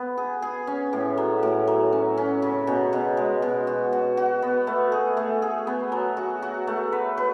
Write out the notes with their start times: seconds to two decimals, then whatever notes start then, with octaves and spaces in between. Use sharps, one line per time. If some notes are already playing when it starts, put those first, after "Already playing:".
Already playing: B3
0.18 G#4
0.42 G#4
0.67 C#4
0.93 A2
1.18 F#3
1.43 A2
1.67 F#3
1.93 C#4
2.17 C#4
2.42 C#3
2.67 B2
2.93 B2
3.17 G#3
3.42 B2
3.67 F#4
3.93 F#4
4.17 F#4
4.42 B3
4.67 A3
4.92 G#4
5.17 A3
5.42 G#4
5.67 B3
5.92 F#3
6.17 F#4
6.42 F#4
6.67 A3
6.92 B4
7.17 B4